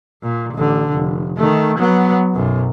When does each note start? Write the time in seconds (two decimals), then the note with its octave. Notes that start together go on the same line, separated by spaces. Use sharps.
0.22 A#2
0.54 A1 D3
0.92 F1
1.37 D#3 A3
1.78 F#3 B3
2.34 B1 F#2